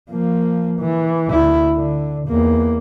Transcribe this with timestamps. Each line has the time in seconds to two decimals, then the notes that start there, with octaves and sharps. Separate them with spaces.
0.11 F3 A#3
0.80 E3
1.30 D2 E4
1.73 D3
2.28 E2 A#3